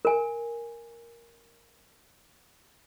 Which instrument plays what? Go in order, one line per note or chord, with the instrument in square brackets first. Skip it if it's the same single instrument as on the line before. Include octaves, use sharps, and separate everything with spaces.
[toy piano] A#4 G#5